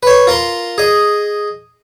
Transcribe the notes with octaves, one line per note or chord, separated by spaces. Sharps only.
B4 C#5
F4 A#4 A#5 C6
G#4 D#5